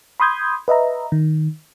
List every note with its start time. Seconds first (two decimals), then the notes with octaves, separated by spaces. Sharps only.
0.20 B5 C6 D#6 G6 G#6
0.68 B4 D#5 E5 A#5
1.12 D#3